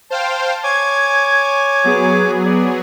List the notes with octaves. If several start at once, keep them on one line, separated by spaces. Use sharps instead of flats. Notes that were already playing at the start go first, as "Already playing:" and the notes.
C5 F5 G5 A5
C#5 G#5 D6 G#6
F#3 B3 G#4
D5